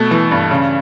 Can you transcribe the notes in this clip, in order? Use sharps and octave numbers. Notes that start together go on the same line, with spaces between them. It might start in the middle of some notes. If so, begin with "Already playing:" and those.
Already playing: B2 A3
E3
G2
C#3